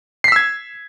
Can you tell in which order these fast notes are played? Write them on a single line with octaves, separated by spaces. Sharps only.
C7 B6 E6 G#6